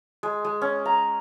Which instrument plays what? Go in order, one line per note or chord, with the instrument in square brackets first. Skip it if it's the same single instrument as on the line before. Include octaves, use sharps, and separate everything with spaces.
[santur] G#3
G#3
C#4
A#5